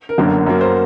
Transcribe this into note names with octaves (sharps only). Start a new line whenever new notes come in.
A#4
G1 F#2 D3 F#3 A#3
F#2 F#3 A#3
C5